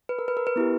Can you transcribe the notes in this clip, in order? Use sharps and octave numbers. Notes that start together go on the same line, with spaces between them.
B4
A#4
B4
A#4
B4
B3 E4 G4